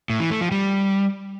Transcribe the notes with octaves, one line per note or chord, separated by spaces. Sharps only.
A2
E3
A3
F3
G3